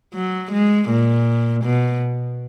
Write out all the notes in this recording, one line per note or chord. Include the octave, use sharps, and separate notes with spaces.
F#3
G#3
A#2
B2